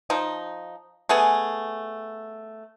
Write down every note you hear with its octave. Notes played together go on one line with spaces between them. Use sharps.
F3 D#4
A3 B3 G#4 G#5